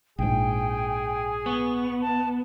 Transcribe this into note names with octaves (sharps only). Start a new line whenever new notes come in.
A#1 G#2 G#4 G5
B3 C#6
A5